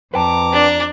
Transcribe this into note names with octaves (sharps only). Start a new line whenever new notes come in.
F2 B4 G5 A5 A#5 D6
D4